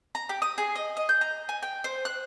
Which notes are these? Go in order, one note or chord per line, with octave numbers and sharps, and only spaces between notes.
A#5
G4
D#6
G#4
D#5
D#5
G6
A#5
G#5
G5
C5
F#6